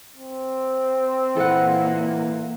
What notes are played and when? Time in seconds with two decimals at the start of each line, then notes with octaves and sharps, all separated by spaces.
0.16 C4
1.36 A#2 E3 A#3 A4 B4 F#5